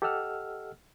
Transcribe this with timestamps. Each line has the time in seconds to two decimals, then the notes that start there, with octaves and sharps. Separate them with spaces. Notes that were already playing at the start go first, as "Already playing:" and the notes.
0.02 G4 A4 D#5 F#5 E6 F6